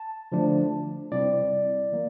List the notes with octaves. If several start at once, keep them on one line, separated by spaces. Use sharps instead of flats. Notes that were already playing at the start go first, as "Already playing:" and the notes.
Already playing: A5
D3 F3 A3 D4
C3 G3 C4 E4 D5
E3 A#3